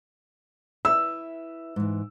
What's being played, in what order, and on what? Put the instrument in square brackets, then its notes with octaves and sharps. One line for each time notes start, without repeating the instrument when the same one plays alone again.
[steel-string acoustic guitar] E4 B4 E5 [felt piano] E6
[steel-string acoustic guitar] G#2 E3